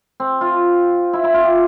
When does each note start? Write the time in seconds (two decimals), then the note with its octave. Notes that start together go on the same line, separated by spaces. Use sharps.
0.20 C4
0.41 F4
1.13 E4
1.24 E4
1.34 F4
1.44 G4